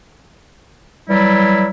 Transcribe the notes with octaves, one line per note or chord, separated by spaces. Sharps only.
E3 F#3 G3 E4